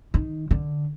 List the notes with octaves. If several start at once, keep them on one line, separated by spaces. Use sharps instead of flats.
D#3
D3